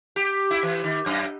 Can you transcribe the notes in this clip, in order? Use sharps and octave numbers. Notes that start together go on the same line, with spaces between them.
G4
E4
E3
D#3
F#2